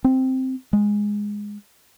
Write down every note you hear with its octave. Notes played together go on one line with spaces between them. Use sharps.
C4
G#3